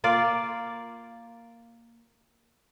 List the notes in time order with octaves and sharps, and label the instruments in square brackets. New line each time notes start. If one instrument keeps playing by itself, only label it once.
[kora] A#3 F4 D5 F5